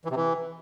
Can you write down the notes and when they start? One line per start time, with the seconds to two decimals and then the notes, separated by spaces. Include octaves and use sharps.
0.05 E3
0.10 C3
0.16 E3